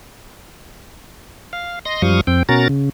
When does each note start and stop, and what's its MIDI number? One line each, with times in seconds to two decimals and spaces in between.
1.53 1.79 77
1.85 2.02 75
1.85 2.02 84
1.85 2.02 94
2.02 2.21 42
2.02 2.21 53
2.02 2.21 55
2.02 2.21 77
2.02 2.21 85
2.02 2.21 87
2.27 2.43 41
2.27 2.43 60
2.27 2.43 79
2.49 2.68 47
2.49 2.68 61
2.49 2.68 66
2.49 2.68 70
2.49 2.68 82
2.49 2.68 93
2.69 2.90 49